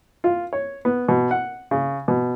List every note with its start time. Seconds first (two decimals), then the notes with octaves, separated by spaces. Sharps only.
0.24 F4
0.53 C#5
0.85 B3
1.09 B2
1.31 F#5
1.71 C#3
2.08 B2